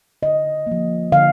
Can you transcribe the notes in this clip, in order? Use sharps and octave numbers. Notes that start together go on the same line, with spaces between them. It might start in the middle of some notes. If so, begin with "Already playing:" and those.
D3 D#5
F3 A#3
D3 F5